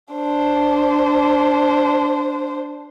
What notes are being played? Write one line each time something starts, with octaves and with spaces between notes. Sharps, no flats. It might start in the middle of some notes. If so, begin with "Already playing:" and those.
D4 C5